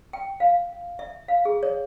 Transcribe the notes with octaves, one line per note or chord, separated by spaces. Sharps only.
G5
F5
E5
F5
G#4
C#5